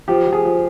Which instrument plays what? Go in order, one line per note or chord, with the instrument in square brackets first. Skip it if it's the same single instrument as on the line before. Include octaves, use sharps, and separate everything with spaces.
[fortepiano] F3 G4
F3
G#4
F3